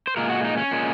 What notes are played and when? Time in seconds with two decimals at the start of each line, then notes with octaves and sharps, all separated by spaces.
0.07 C5
0.17 A#2 G#3 A#4
0.30 F#4
0.44 D#4
0.57 C#4
0.71 A#2 G#3